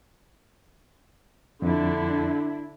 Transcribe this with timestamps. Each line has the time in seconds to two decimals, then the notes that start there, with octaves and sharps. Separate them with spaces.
1.62 F2 D3 D4 E4